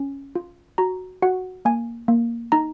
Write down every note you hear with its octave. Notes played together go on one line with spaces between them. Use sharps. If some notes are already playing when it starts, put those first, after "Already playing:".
Already playing: C#4
F4
F#4 A#5
F#4 F#5
A#3 G#5
A#3
D#4 A#5